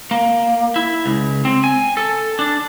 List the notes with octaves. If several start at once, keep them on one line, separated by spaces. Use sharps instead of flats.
A#3
E4
C#2
C4
G#5
A4
D4